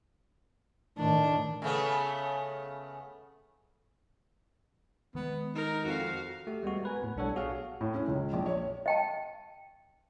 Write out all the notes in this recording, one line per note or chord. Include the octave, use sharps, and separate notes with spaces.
A2 D#3 D4
C#3 A3 B3
D#3 G#3 B3
D#4 A#4
F2 F#4 F5
A3 F#4 G4
G3 G#3 B3 F#4
A#4 B4 G#5
A2 B3
B1 G3 D4 A4 C#5 F#5
B3 F#4 G#4 C#5 F5
A2
C#4
C#2
A#1
C#5
D#5 G5 A5